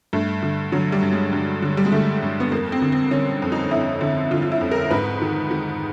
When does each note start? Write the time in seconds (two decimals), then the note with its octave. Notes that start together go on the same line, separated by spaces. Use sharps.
0.13 G2 A3
0.42 D3
0.72 D3 F#3
0.92 G3
1.02 G2
1.12 G#3
1.33 G2
1.62 D3
1.77 G3
1.85 G#3
1.92 D3 A3
2.22 G2
2.40 B3
2.52 F2 A#3
2.72 C4
2.82 D3
2.92 C4
3.11 D3 C#4
3.42 F2
3.52 D#4
3.71 F2 E4
4.01 D3
4.31 D3 F4
4.42 F4
4.52 E4
4.61 F2
4.71 A#4
4.90 G#2 B4
5.22 D#3
5.51 D#3